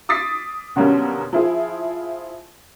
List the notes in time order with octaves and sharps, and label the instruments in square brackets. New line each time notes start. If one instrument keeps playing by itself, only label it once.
[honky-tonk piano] D6 D#6 A6 B6 C7
B2 D3 F#3 G3 A#3 C#4
F3 E4 G#4